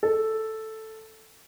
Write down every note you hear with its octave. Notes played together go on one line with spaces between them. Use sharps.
A4